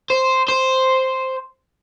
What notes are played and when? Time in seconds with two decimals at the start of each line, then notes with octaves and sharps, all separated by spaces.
0.10 C5
0.48 C5